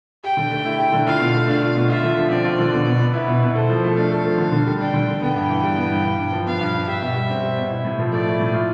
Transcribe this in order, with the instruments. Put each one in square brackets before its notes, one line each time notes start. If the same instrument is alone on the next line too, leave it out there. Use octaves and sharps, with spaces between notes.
[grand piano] G4 [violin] G5
[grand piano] D3
A3
E4
G4
D3
[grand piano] F4 [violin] F5
[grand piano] B2
A3
[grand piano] D4 [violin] F5
[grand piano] F4
B2
[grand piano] F4 [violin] E5
[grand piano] D3
F3
[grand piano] C4 [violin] D5
[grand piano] F4
D3
B2
B2
B3
[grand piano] E4 [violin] B4
[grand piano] B2
B2
[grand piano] A4 [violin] C5
[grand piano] F3
A3
[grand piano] D4 [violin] F5
[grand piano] A4
F3
D3
D3
G3
[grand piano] D4 [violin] G5
[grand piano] D3
D3
[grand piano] B3 [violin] G5
[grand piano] G2
E3
G3
B3
G2
G2
G2
F3
[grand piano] B3 [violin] F5
[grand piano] G2
G2
[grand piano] G4 [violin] E5
[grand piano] B2
G3
C4
G4
B2
E4
A2
F3
[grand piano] A3 [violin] D5
[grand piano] E4
A2
F4